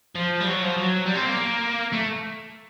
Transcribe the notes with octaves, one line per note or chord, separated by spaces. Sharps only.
F3
G3
F#3
F3
F#3
G3
C4
A#3
A3